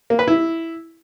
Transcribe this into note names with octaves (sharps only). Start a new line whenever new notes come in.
A#3
B4
E4